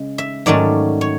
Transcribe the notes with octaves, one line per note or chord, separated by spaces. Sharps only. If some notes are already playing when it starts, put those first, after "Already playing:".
Already playing: C#3 G#3
E5
G#2 D#3 F#3 A3 C#4 D5
C#5